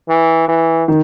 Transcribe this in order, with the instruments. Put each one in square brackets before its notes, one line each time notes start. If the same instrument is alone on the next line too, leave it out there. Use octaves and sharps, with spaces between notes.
[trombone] E3
E3
[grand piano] D#3